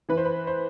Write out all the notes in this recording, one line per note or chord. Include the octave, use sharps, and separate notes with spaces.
E3 B4
C5
B4
C5